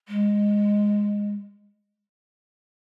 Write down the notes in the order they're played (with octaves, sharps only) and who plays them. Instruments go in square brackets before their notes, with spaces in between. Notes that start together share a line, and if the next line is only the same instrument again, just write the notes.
[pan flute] G#3